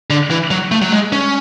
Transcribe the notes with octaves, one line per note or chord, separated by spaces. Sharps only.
D3
E3
F#3
A3
F#3
G#3
C#4